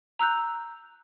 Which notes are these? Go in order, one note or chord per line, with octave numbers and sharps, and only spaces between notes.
A#5 E6 F#6 G6